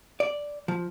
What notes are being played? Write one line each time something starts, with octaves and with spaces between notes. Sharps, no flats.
D5
F3